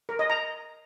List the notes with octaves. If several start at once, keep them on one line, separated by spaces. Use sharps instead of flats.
A#4
D#5
A#5